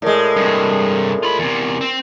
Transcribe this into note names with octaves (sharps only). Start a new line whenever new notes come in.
A2 G#3 A#4 D5
G2 C3
F4 B5
E2 C3
C4